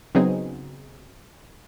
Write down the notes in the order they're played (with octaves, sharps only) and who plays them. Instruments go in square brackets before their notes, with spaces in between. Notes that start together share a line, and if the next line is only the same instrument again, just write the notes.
[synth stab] C#3 F#3 B3 C4 D#4 G#4